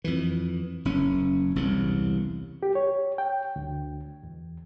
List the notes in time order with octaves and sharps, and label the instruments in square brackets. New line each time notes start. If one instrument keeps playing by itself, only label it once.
[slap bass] F2 E3
F#1 C#4
E1 C2 C#3
[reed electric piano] G4
C#5
G5
D2
E2